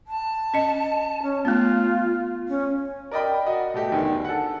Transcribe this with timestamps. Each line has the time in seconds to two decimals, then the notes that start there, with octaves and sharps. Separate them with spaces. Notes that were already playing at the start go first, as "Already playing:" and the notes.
0.07 A5
0.54 C#4 D#5
1.23 C#4
1.45 A3 B3 F4
2.48 C#4
3.11 A#4 D5 D#5 G5 B5
3.46 F#4 D#5
3.74 B2 A3 G4
3.92 E2 D3 D#3
4.25 A4 F#5